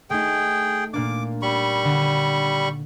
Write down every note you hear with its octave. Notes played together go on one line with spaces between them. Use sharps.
A3 D#4 G#4 G5
A#2 A#3 D4 D6
G3 B5 C#6
D3